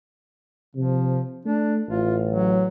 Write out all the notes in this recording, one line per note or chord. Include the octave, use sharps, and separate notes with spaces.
C3 F3
A3 D4
A1 F4
F#3